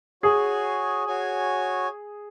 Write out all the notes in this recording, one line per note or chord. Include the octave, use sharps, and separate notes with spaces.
F#4 G#4 C#5 G#5
F#4 C#5 G#5